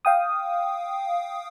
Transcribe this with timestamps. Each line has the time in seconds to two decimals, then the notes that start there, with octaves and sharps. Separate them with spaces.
0.05 F5 G5 D#6